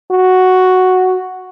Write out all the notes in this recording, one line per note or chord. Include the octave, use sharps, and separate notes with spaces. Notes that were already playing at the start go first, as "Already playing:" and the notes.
F#4